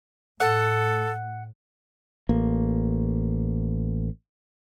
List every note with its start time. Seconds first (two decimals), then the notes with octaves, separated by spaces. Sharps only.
0.40 A2 A4 F#5
2.29 A1 A#3